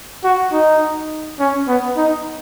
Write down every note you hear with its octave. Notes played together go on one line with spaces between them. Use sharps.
F#4
D#4
C#4
B3
D#4